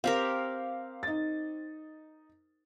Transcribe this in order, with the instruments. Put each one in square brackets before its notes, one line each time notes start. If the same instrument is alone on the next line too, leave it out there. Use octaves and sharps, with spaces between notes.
[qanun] C4 G4 A#4 [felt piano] F5
[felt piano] D#4 A6